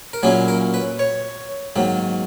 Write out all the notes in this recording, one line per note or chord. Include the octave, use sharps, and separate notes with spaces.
A#4
A#2 F#3 A#3 C#4 E4 G#4
A#4
B4
C#5
G#2 D#3 F#3 A#3